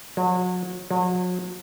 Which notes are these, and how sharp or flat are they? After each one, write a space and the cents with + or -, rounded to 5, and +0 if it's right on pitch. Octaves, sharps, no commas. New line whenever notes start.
F#3 -35
F#3 -40